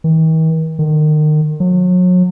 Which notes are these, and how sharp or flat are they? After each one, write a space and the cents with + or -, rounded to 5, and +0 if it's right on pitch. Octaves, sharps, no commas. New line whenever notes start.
D#3 +45
D#3 -30
F#3 -35